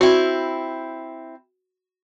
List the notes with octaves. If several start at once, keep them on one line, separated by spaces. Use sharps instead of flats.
C4 E4 F#4